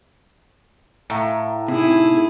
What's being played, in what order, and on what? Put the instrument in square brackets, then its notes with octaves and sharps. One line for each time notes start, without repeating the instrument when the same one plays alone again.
[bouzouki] A2 [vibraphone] F5 A#5
[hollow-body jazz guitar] C3 [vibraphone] D#4 [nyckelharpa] E4 G#4